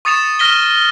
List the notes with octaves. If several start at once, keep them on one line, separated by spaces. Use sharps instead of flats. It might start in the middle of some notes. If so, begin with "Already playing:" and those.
C#6 D#6 A6 C#7 E7 F7
F6 A#6 B6 D#7 G7